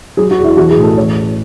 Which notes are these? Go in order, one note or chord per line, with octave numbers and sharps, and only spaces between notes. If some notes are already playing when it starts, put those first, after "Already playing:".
F#3 G#4
F#4
E2
E4
E3 F#4
G#4
A1
A4
E3 C#5